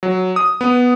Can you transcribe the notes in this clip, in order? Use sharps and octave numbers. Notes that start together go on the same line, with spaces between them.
F#3
D#6
B3